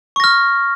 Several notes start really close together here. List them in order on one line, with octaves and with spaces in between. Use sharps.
C#6 A#6 F6